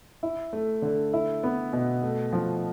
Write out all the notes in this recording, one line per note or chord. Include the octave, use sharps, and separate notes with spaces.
E4
A3
D3
E4
B3
B2
A3
F3